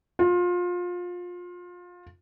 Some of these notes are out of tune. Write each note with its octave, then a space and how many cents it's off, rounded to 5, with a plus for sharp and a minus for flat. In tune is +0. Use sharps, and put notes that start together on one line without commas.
F4 +25